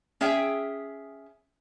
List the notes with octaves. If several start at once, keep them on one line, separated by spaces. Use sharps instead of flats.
C#4 G#4 E5 G5